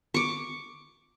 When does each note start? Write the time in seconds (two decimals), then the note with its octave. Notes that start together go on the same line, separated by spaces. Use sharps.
0.14 C#6 D6